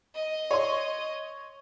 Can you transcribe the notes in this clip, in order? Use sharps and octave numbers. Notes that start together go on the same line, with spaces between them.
D#5
C#5 C6